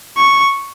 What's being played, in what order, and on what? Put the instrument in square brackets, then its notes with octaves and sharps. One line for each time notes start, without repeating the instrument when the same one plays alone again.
[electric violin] C#6